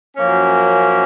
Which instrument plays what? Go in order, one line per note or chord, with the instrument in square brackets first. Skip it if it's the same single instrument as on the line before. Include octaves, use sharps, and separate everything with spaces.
[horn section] F#2 F3 A#3 C#4